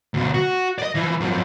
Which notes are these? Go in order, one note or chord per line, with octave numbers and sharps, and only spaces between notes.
D2 B2
F#4
D5 D#5
E3 F3
F#2 F3